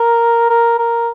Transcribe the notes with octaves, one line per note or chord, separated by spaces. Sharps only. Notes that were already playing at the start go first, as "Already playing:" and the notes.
Already playing: A#4
A#4
A#4